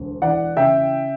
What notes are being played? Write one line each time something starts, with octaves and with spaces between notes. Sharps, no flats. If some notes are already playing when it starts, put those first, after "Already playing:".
Already playing: E1 D2
E3 D5 F#5
C#3 E5 G5